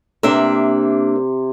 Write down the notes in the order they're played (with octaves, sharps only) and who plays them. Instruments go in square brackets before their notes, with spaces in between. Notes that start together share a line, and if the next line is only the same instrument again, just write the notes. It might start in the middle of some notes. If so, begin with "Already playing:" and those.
[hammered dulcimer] C3 [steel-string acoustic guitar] A#3 D4 E5